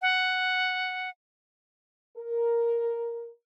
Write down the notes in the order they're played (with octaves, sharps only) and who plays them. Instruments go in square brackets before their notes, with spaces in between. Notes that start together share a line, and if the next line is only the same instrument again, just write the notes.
[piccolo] F#5
[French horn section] A#4